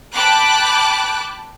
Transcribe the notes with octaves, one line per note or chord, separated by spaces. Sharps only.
G5 A5 B5 D6 F#6